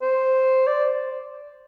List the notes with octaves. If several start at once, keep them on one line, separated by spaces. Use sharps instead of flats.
C5
D5